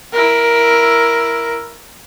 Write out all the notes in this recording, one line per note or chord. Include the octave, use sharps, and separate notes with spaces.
E4 A#4